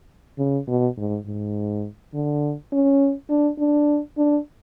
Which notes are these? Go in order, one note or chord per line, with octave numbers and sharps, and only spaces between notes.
C#3
B2
G#2
G#2
D3
C#4
D4
D4
D4